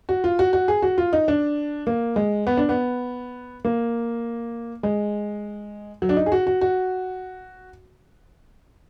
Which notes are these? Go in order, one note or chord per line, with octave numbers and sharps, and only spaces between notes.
F#4
F4
F#4
F#4
G#4
F#4
F4
D#4
D4
A#3
G#3
B3
D4
B3
A#3
G#3
F#3
D4
D#4
G#4
F#4
F#4
F#4